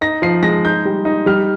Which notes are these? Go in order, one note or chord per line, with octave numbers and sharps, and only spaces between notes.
D#4 A#6
F3 C7
G#3 A#6
D#4 G6
G3
D#4
G3 F6